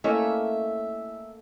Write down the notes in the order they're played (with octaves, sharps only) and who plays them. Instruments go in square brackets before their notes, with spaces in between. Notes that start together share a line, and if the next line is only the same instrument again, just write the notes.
[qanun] A3 A#3 C#4 [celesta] E4 C#5 D#5 [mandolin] E5